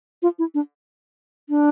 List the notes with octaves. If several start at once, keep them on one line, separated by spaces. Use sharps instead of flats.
F4
E4
D4
D4